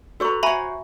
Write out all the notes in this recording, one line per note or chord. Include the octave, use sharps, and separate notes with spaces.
F#4 A4 B4 C#5 A#5 C#6
F#4 C5 C#5 E5 G#5 A#5 B5